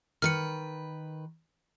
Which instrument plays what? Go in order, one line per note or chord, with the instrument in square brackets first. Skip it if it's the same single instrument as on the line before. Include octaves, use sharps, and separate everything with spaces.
[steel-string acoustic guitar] D#3 B4 [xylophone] F6 C#7